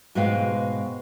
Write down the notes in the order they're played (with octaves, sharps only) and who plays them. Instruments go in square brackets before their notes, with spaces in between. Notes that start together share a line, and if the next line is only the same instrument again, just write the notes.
[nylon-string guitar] G#2 B2 G#3 B4 F5 G5